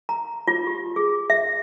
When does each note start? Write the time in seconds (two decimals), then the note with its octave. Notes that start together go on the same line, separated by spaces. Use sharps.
0.09 A#5
0.48 F4
0.67 G4
0.96 G#4
1.30 E5